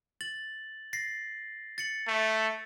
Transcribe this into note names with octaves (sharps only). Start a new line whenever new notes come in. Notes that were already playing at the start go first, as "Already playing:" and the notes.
A6 F#7
A6 A#6 C7
A6 C#7 F#7
A3